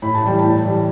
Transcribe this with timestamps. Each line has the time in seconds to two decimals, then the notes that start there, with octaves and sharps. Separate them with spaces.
0.02 A2 B5
0.14 A5
0.23 E3 G3 G5
0.39 A2 A5
0.64 E3 G3